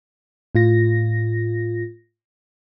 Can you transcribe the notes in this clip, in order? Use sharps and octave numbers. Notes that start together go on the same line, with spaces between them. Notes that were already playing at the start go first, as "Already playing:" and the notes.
A2 F4 A#6